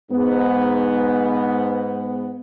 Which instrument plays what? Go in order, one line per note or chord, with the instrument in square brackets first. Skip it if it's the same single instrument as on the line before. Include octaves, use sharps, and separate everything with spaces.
[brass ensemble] G#2 B3